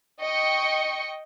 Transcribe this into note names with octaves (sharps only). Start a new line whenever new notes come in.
D#5 G5 C#6 C#7